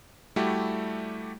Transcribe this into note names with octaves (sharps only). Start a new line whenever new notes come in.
G3 A3 E4 F#4 G4